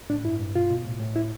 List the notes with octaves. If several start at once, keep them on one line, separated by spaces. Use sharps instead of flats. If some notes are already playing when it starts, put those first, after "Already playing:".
A2 D4
G2 E4
G2
B2 F4
B2
A2
A2
E4